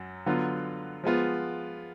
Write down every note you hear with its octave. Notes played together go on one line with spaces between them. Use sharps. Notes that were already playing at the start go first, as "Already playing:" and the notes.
Already playing: F#2 F#3
D3 F#3 B3 F4
F3 G#3 B3 F4